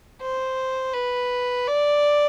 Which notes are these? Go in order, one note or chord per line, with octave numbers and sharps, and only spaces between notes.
C5
B4
D5